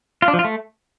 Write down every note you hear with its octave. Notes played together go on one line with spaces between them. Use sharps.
F4
D4
F3
F4
A3